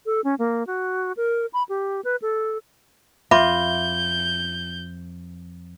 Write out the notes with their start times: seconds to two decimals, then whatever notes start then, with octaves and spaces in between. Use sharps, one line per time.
0.06 A4
0.24 C#4
0.39 A#3
0.67 F#4
1.17 A#4
1.53 B5
1.69 G4
2.04 B4
2.22 A4
3.31 F2 F4 E5 B5 D6 G6